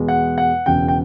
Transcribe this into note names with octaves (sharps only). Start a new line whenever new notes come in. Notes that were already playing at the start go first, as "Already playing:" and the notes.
Already playing: E2 B2 G#3
F#5
F#5
E1 E2 C#3 G5
G5